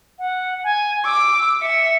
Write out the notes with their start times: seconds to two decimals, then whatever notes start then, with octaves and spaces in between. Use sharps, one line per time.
0.19 F#5
0.64 G#5
1.05 D6 E6
1.62 E5 C#7